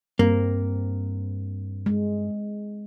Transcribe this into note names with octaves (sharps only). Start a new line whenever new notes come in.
G2 A#3 C4
G#3